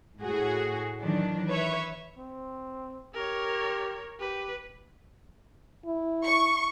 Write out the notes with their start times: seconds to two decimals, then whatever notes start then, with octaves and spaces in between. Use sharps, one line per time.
0.22 A2 F#4 G#4
1.03 D#3 E3 F#3 D4
1.51 B4 C#5 E5
2.17 C4
3.15 G4 A#4 C#5
4.20 G4 B4
5.86 E4
6.25 C#6